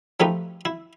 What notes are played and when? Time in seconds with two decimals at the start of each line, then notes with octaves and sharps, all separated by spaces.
0.20 F3 A3 D#4 F4 G4 B4
0.65 E4